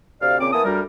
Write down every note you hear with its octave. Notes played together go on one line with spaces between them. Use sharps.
D2 C3 D5 F5
A#2 C#3 C4 D6
E3 A#3 B3 A5 D#6
D2 G3 A#4